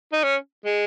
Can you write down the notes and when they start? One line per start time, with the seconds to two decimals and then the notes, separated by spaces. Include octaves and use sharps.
0.12 D#4
0.23 C#4
0.65 G#3